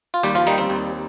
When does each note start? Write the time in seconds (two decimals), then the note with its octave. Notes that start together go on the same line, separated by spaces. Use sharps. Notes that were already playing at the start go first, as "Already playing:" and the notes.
0.14 F4
0.23 D#2 G3 G4
0.35 F3 F4
0.47 D#3 G3 D#4
0.58 C4
0.70 D#2